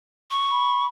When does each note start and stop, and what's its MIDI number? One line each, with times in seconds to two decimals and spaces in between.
0.31 0.86 85
0.51 0.88 83